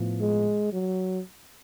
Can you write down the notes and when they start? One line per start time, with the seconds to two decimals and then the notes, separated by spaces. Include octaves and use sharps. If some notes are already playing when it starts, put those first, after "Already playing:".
Already playing: A2 F3 B3
0.21 G#3
0.73 F#3